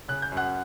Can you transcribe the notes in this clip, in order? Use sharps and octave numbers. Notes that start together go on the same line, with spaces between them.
C#3 F#6
G6
F#2
F#5 F#6